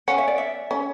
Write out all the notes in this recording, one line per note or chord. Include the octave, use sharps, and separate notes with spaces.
C#4 F#5
E5
D5
E5
C#4